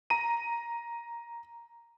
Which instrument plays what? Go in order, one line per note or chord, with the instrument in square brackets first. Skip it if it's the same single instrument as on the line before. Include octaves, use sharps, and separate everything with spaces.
[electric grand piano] A#5 D#7